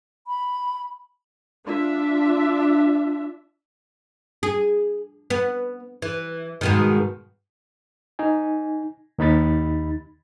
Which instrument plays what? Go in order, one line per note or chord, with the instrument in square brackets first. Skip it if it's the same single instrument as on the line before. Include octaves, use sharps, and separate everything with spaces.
[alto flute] B5
[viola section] D4 F4 E5
[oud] G#4
B3
E3
G#2 B2 D#3
[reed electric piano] D#4 G#5
D#2 D#4 B5 A6